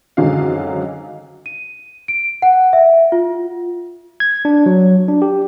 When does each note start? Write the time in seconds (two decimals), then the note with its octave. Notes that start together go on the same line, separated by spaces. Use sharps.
0.17 G#1 F#2 D3 F#3 G#3 F5
1.46 D#7
2.08 D7
2.42 F#5
2.73 E5
3.12 F4
4.20 G#6
4.45 D4
4.66 F#3
5.08 D4
5.22 G4